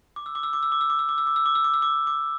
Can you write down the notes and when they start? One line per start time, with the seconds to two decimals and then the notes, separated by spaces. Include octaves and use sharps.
0.16 D6
0.26 E6
0.35 D6
0.43 E6
0.53 D6
0.63 E6
0.72 D6
0.81 E6
0.90 D6
0.99 E6
1.09 D6
1.18 E6
1.27 D6
1.36 E6
1.46 D6
1.55 E6
1.64 D6
1.74 E6
1.82 D6
2.07 D6